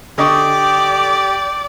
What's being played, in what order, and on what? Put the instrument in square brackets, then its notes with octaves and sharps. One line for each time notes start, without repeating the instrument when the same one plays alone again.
[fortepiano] D3 D#5 C#6 [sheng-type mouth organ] G4 [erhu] D5